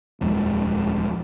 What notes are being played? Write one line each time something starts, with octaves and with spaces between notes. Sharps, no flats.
D#1 F2 G#3